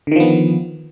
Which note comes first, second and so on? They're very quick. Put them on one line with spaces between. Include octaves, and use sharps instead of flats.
D3 D#3 F3 B3